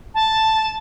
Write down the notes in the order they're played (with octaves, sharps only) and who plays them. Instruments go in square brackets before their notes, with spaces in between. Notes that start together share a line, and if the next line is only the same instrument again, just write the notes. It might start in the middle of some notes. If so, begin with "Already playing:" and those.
[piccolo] A5